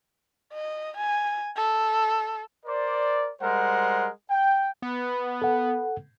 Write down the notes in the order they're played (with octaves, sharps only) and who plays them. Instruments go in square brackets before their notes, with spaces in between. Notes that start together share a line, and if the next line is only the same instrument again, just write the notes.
[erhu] D#5
G#5
A4
[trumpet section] A#4 C5 D5
G3 G#3 A#4 C5 F#5
G5
[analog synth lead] B3
[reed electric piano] A4 F#5